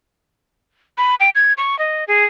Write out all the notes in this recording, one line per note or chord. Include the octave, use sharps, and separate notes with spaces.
B5
G5
G#6
C#6
D#5
G#4